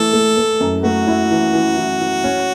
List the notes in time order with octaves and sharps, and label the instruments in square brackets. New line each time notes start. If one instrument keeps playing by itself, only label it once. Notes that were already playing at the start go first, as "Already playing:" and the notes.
Already playing: [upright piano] E3 A3 E4 [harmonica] A4
[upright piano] A3
A3
F#2
[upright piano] A3 [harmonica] F#4
[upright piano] E4
E3
E3
E3
E3
C#4